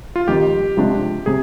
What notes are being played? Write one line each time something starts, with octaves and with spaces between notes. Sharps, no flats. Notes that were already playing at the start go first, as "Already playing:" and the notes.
F4
F2 D#3 G3 G4
C3 F3 G#3 D4
C3 G#4